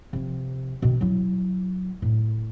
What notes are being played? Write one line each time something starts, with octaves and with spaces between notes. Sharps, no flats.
C3 F3
B2 D#3
F#3 E4
A2